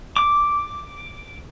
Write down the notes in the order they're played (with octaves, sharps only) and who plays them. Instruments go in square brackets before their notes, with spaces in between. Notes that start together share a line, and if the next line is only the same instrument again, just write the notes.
[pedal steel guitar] D6